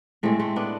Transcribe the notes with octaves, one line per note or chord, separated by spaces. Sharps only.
A2 G#3 A3 C4
A3 C4
B3 D4